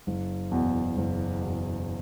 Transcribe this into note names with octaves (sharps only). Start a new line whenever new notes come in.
F#1
E2 B2
F#1
E2 B2